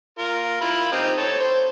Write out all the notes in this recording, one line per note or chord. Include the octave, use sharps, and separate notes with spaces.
F4 A#4
E4 F4 B5
C4 D#4 G4
C4 A4 C#5
C5